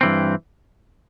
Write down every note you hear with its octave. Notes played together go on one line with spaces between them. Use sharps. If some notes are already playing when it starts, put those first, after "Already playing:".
G2 E3 C4